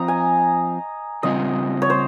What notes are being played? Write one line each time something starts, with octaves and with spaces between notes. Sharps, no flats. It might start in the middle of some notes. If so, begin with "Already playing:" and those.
Already playing: F3 C4 F4 D#5 A#5
G#5
C#3 G3 C4 F4 D#5
C#5
C5